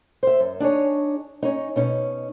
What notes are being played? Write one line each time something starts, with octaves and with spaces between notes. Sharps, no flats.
C5 E5
F#2
D4 D#4 G#4 C#5
C#4 D#4
B2 C#4 D#4